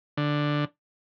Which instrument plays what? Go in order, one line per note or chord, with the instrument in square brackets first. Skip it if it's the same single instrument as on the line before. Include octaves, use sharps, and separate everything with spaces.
[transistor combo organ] D3